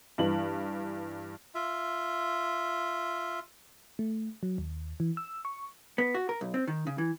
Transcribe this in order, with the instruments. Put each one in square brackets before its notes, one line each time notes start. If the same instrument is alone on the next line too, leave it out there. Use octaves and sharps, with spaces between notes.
[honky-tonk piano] G2 E3 F#7
[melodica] F4 E5
[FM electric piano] A3
F#3
D#2
E3
E6
C#6
[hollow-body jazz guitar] B3
F#4
A#4
B1
C4
D#3
C#3
E3